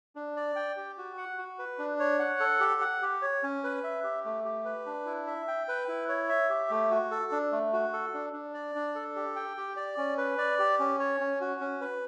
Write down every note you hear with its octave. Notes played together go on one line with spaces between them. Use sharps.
D4
D5
G5
G4
F#4
F#5
F#4
B4
D4
C#5
F#5
A4
G4
F#5
G4
C#5
C#4
B4
E5
G4
A3
G4
B4
D4
E4
E5
G5
B4
E4
C#5
E5
G4
A3
F#4
A4
D4
A3
F#4
A4
D4
D4
D5
D4
A4
G4
G5
G4
D5
C#4
B4
D5
G4
C#4
C#5
C#4
F#4
C#4
B4